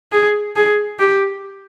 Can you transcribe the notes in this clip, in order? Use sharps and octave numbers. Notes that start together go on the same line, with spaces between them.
G#4
G#4
G4